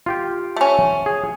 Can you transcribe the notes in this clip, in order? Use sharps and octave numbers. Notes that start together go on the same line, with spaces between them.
F4 G4 G5
A3 C#4
G#4